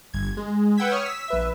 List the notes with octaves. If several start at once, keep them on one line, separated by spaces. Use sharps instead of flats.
G1 G#6
G#3
B4 F#5 G5 E6 G#6 B6
C#5 C#6 D#6 F6
E6 B6
A#1 B4 E5